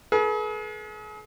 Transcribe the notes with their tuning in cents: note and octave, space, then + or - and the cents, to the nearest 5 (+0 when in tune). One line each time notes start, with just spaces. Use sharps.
G#4 +40 B4 -45